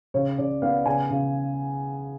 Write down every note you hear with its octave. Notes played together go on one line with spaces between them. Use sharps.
C#3 C#5
C#3 D5
B3 F5
C#3 G#5
C#3